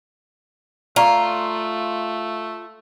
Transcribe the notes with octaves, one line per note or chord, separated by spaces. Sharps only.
A3 F4 D5 A#5 C#6